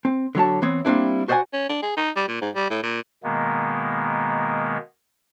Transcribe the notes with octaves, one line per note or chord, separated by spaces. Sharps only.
C4
D3 F#3 C#5 A5
E3 B3 C4 C#5
G3 A#3 C4 D4 E4
F#4 C5 D5 D#5 F#5 G#5
C#4
D4
G#4
D#4
G3
A#2
G#2
G3
A2
A#2
B2 D#3 G#3 A#3 B3